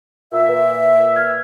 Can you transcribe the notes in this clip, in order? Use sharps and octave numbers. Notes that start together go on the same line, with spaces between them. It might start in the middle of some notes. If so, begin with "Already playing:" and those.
A#2 E5
B4
F6 G#6